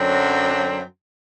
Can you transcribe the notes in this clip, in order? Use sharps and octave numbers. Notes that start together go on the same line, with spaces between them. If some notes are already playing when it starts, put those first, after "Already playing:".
Already playing: F#2 D3 F#3 C4